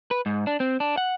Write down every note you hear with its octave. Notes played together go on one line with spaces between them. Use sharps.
B4
G#2
D4
C4
D4
F#5